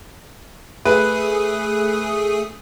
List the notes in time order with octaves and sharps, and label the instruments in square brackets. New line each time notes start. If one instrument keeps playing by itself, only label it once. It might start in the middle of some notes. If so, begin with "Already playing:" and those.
[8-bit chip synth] A3 G#4 D#6 [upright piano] B4